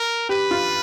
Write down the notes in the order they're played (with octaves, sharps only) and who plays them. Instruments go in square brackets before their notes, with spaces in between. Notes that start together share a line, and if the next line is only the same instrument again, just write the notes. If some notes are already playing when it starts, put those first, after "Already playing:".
Already playing: [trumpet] A#4
[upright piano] G4 [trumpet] B4
[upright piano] F4